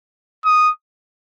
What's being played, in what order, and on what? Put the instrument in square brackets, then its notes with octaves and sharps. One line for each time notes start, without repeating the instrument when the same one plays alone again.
[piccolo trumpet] D#6